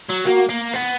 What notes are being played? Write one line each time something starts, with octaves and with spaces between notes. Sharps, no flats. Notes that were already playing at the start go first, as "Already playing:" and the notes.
F#3
A#3 F#4
A#3
B3